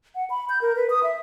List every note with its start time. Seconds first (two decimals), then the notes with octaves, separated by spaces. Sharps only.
0.15 F#5
0.30 B5
0.49 G6
0.62 A#4
0.76 B4
0.90 D#6
1.03 E5